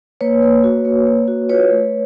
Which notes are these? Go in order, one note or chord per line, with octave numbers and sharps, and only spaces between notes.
A#3 B4 C#5
A#3
F#4
A#3
A#3
F#4
F4 B4 C#5
A3